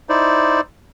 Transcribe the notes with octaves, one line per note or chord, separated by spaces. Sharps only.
D#4 E4 C5 D5